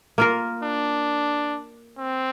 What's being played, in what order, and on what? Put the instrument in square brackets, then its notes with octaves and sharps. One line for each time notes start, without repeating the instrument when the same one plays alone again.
[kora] A#3 F4 A#4
[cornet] D4
C4